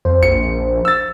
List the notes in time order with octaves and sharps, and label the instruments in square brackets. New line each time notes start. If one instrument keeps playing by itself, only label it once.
[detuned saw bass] F2 [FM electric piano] C5
[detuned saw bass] A#1 [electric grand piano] C#7
[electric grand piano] E6 A6